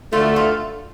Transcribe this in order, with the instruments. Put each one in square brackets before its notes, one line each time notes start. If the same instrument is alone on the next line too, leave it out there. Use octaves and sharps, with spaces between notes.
[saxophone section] D2 D3 A3 [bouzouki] F4
[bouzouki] F4